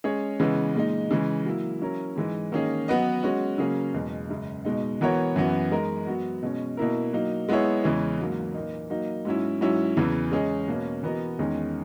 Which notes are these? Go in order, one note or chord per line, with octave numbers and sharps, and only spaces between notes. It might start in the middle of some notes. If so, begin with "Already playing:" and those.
G#3 C#4 G#4 C#5
C#3 E3 G#3 B3
A#2 G#3 D#4
C#3 E3 G#3
F#3 A#3 E4
F#3 C#4 E4 A#4
G#2 E3 G#3
D#3 A#3 C#4 G#4 D#5
F#3 B3 F#4 B4 D#5
G#3 C#4 F#4
C#3 F#3 A#3 C#4 G#4
E2 B2 G#3
F#2 C#3 G#3
B2 G#3 D#4
E3 B3 F#4 A#4 C#5
F#2 E3 B3 F#4
G#3 D#4 A#4
F#3 B3 F#4
B2 G#3 C#4
B2 A#3 E4 A#4
F#3 A#3 D#4
G#3 B3 E4 G#4 C#5
E2 C#3 E3 G#3 C#4
G#2 F#3 A#3
A#2 A#3 D#4
F#3 A#3 D#4
G#2 F#3 C#4 E4
G#2 F#3 C#4 E4
E2 C#3 E3
G#3 C#4 G#4 D#5
B2 A#3 C#4
E3 B3 F#4 A#4 D#5
E2 D#3 G#3 C#4